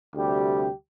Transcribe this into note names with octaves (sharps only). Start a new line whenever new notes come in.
D2 C3 G3 G4